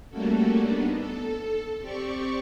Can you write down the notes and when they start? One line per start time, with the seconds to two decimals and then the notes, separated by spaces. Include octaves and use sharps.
0.10 G3 A3 A#3 C#4 F#4 A4
0.60 B3 D4 D#4
0.97 A4
1.79 C4 G4 D5 C#6